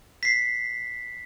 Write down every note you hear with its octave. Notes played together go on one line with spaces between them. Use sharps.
B6 C7